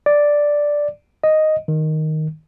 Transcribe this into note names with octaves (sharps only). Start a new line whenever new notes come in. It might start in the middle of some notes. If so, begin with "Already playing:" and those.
D5
D#5
D#3